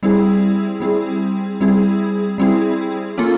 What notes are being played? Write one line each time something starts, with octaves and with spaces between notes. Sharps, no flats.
G3 C4 E4 G#4
G3 C4 E4 G#4
G3 C4 E4 G#4
G3 C4 E4 G#4
A#3 C#4 F4 A4